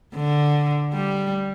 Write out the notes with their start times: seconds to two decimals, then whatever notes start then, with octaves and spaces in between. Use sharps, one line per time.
0.15 D3
0.93 G3